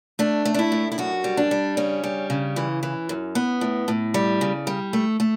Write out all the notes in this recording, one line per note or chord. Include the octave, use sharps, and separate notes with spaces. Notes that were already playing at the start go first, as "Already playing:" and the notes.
A3 D4
A3
D4
E4
A2
E4
F#2 F#4
G3
D4
G3
C#3 C#4
G3
C#3
E3
E3
F#2
B3
A2
A2
G3
C#3
G3
A3
A3